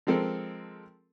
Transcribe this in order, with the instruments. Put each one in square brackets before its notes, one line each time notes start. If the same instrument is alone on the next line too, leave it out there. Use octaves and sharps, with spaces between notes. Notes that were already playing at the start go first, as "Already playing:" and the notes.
[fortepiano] F3 G#3 C4 A4 A#4